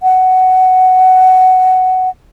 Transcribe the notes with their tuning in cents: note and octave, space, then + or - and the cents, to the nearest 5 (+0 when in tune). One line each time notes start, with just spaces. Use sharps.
F#5 +10